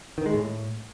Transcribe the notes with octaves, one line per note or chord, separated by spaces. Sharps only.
D#3
G#3
A2